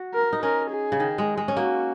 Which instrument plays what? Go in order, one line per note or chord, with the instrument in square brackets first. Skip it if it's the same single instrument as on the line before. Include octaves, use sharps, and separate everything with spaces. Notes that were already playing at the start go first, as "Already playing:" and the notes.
Already playing: [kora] F#4
[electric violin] A#4
[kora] D#4
[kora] C#4 [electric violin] A#4
[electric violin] G#4
[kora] C#3
D#3
G#3
G#3
C#4
[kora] A#3 [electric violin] F#4